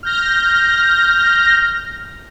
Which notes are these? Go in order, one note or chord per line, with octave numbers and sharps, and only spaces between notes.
F6 G6 A#6